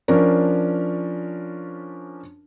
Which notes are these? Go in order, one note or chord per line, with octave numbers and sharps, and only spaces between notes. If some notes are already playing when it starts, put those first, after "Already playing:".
F3 C#4 D4 A#4